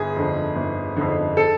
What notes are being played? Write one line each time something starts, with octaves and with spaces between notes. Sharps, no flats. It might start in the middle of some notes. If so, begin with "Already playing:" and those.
Already playing: G1 G#4
F2 D3
G1
F2 D3
A4